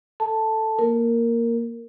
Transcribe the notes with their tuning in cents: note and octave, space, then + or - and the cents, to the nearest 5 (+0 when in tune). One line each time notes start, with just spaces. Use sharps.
A4 +5 A5 +0
A#3 +0 A#4 -10